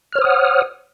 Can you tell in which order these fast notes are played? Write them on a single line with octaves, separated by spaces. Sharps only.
F6 C#5 C5 D#6 F#5